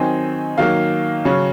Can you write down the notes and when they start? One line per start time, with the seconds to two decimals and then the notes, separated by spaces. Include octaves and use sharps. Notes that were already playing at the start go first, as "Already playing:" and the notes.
Already playing: D#3 F#3 C4 D#4 G#5
0.58 D#3 F#3 A#3 F5
1.25 C#3 F#3 C#4